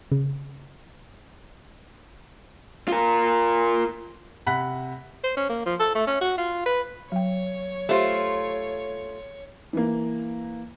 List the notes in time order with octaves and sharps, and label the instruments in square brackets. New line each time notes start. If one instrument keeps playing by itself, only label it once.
[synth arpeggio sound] C#3
[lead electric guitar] F4 A#4
[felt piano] C3 F#5 B5 F#6 B6
[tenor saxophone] C5
C#4
A#3
F3
A4
A3
C#4
F#4
F4
B4
[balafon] F#3 G5 [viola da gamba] C#5
[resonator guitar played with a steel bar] A3 F4 [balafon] G4 C5
[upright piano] E3 A#3